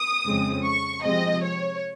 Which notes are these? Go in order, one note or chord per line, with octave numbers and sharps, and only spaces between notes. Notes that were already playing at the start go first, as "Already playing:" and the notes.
Already playing: D#6
F2 C#3 G#3 C4
C#6
C3 F3 G#3 C4 D#5
C#5